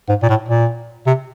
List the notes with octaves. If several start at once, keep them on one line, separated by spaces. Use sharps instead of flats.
G#2
A#2
A2
A#2
C3